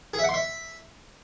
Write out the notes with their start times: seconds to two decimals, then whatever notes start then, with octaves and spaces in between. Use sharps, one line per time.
0.14 G#4
0.19 E5
0.24 F#5
0.29 C6
0.34 E5